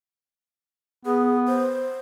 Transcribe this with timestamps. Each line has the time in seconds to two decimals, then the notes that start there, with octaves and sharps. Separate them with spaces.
1.05 B3 G#4
1.48 C5